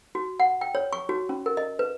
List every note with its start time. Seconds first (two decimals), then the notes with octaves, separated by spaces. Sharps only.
0.15 F#4
0.40 F#5
0.61 G5
0.75 C#5
0.93 C#6
1.09 F#4
1.29 C#4
1.46 A#4
1.57 D#5
1.79 B4